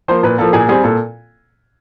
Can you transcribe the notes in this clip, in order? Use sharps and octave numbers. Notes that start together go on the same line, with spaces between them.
F3 A#3 C5
A#2 B4
F3 A#3 A4
A#2 G#4
G3 C4 G#4
A#2 A4